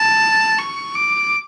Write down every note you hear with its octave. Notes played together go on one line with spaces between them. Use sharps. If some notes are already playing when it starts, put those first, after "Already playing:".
Already playing: A5
C#6
D6